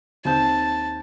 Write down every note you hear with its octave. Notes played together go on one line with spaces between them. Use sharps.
D#2 C4 A5 G6